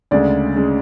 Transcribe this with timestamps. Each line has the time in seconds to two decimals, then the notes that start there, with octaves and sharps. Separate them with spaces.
0.11 D2 C#3 G#3 D5
0.56 C#3 G#3